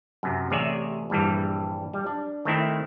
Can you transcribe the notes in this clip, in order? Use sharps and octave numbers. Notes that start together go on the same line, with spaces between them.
F#2 C3
A1 C3 G#4 C#5 D5 E5
A#1 G2 E3 G3
G3
D4
D#3 A3 C4 E4